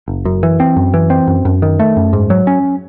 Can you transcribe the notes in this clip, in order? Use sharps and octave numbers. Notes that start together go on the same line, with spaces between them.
F#1
F#2
E3
C4
F#2
E3
C4
F#2
F#2
D#3
A3
F#2
G#2
F#3
C#4